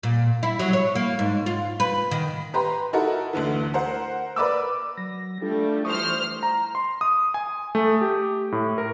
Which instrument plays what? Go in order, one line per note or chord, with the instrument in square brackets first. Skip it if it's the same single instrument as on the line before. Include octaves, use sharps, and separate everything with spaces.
[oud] A#2
E4
F#3
C#5
A#3
G#2
F4
B4
D#3
[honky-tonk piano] G4 B4 A#5 C6
D#4 E4 F#4 A4 A#4
D2 D3 E3
A#4 C5 F#5
A#4 B4 D5 D6 E6
[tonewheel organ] F#3 A#6
[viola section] G3 A3 [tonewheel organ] D4 F4 A4
[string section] E3 C5 F6 [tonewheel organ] C#6 D#6
[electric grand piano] A#5
C6
D#6
G#5
A3
G4
A2
A#4